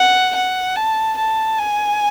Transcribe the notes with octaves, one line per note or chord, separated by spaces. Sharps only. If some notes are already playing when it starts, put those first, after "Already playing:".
Already playing: F#5
F#5
A5
A5
G#5